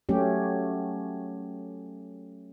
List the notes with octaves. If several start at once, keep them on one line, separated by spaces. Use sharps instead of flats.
F#3 A3 C#4 G4